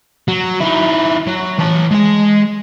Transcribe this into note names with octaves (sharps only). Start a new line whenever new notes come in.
F#3
D#3 E4
F#3
E3 A5
G#3 G#5